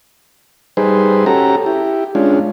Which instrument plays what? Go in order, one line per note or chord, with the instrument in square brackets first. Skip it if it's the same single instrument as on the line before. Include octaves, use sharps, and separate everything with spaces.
[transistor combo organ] G3 D#4 G#4 B4 C5
C#4 F#4 G4 A4 A#5
E4 G4
G#3 C#4 D4 F4